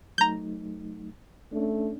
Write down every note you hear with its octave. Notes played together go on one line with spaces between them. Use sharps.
F#3 A3 D#4 A#5 G6
A3 C#4 D4